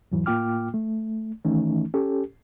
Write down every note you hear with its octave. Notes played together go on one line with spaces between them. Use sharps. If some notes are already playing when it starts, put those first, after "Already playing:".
E2 G#2 E3 F#3 E4
A2 A#3 F4 G5 D6 F6
A3
D#3 E3 A3 C#4 D#4
C#4 G4 A4